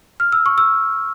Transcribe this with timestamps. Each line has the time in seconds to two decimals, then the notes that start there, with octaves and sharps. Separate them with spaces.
0.20 F6
0.32 E6
0.46 C#6
0.58 E6